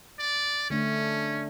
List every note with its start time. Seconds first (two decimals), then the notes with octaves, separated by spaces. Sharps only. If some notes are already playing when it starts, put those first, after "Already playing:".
0.19 D5
0.70 D3 A3 C#4 D4